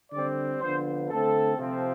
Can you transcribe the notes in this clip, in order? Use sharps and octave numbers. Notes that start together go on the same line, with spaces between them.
D3 G3 C4 D5
D3 F3 B3 D4 C5
D3 A3 C4 A4
C3 F3 C4